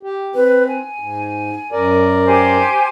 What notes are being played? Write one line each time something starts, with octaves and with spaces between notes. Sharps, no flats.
G4
C4 B4
G#5
G#2
F#2 A#4 D5
G4 C5 G#5